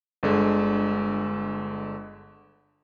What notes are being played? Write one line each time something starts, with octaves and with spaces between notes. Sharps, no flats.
G1 D3 G#3